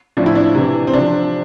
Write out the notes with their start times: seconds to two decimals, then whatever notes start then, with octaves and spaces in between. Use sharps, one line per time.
0.17 A2 F3 D4
0.26 E4
0.35 D4
0.55 C3 E3
0.87 C4
0.93 C3 F3 D4